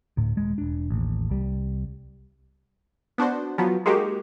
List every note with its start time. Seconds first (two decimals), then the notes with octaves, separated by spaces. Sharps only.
0.17 D2 A2
0.37 D#1 G#3
0.58 E1 D4
0.90 A1 D#2
1.30 C2 G3
3.18 B3 D4 F#4 C5
3.58 F3 F#3 B3
3.86 G#3 A#3 D#4 F#4 G4